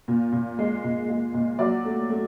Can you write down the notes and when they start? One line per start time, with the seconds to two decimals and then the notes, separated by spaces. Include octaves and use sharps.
0.08 A#2
0.32 A#2
0.59 G#3
0.84 A#2
1.09 G#3
1.34 A#2
1.59 F#3 D5
1.85 A3
2.10 A3